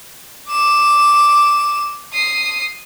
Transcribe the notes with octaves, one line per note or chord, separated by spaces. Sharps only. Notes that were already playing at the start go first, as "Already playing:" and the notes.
D6 E7
D#6 C7